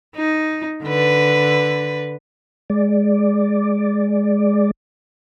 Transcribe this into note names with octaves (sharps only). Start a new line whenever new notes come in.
D#4
D3 B4
G#3 D5